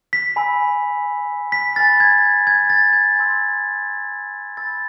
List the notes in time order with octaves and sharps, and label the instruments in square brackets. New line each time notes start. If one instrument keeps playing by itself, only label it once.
[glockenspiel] B6
G#5 B5 E6
B6
G#5 B5 F6 A6
G#6
G#6
A6
G#6
G#5 C6 E6
B5 E6 A6